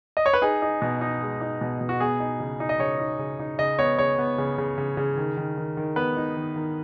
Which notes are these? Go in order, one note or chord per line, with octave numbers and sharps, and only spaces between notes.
D#5
C#5
B4
D#4 G#4
D#4
B2
D#4
G#3
D#4
B2
B2
F#4
B3 G#4
D#4
C#3
D#4
D#5
C#3 C#5
D#4
C#3
D#4
C#3 D#5
B3 C#5
C#3 C#5
B3
C#3
C#3
C#3
C#3
D#3
D#3
D#3
D#3
B3 B4
D#4
D#3
D#3